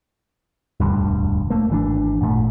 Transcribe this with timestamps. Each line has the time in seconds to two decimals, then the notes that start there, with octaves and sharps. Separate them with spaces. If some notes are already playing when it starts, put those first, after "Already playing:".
0.80 E1 D2 G2
1.50 A3 A#3
1.70 G#1 E3 D4
2.21 G#1 F#2 A#2 A3